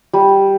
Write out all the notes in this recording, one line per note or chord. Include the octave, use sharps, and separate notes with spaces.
G3